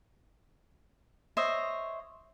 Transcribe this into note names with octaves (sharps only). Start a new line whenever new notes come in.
C5 C#5 D#5 E5